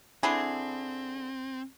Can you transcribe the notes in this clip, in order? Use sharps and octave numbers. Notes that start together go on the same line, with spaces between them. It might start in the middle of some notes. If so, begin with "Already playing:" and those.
D3 C4 E4 G#4